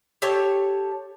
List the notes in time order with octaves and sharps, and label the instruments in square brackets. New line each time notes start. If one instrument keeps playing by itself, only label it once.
[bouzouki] G4 A4 C#5 A5